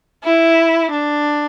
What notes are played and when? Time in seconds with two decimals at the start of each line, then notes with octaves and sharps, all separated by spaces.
0.24 E4
0.91 D4